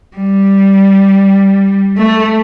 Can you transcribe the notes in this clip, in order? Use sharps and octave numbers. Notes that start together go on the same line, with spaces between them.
G3
A3